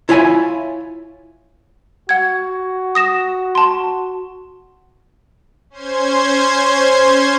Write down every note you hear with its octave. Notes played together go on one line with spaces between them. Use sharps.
E4 F4 C#5 E5 G#5
F#4 F#5 G#6
D#6 A#6 E7
A5 C6
C#4 C5 C6 G#6